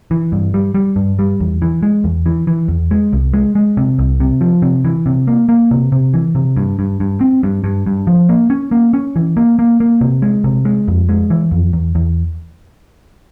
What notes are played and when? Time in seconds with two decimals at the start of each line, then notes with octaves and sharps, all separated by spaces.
0.11 E3
0.32 G2
0.54 G3
0.75 G3
0.96 G2
1.19 G3
1.40 E2
1.62 E3
1.83 G#3
2.04 E2
2.26 E3
2.47 E3
2.68 E2
2.91 G#3
3.13 C2
3.34 G#3
3.55 G#3
3.77 C3
3.99 C2
4.20 C3
4.41 F3
4.62 C3
4.85 E3
5.06 C3
5.27 A#3
5.49 A#3
5.71 C3
5.92 C3
6.14 E3
6.35 C3
6.56 G2
6.79 G2
7.00 G2
7.21 C4
7.43 G2
7.64 G2
7.86 G2
8.07 F3
8.29 A#3
8.50 C#4
8.71 A#3
8.93 C#4
9.16 E3
9.37 A#3
9.59 A#3
9.80 A#3
10.01 C3
10.22 G#3
10.44 C3
10.65 G#3
10.88 F2
11.09 G#3
11.30 E3
11.51 F2
11.73 E2
11.95 E2